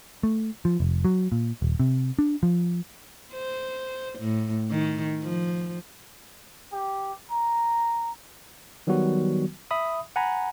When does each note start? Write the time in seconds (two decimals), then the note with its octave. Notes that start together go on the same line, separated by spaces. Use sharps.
0.23 A3
0.65 F3
0.80 F1
1.05 F#3
1.32 A#2
1.62 D#1
1.80 C3
2.19 D4
2.43 F3
3.33 C5
4.19 A2
4.71 D#3
5.23 F3
6.72 G4
7.31 A#5
8.87 D#3 F#3 G3 B3 F#4
9.71 E5 B5 D#6
10.16 F#5 G#5 A#5 B5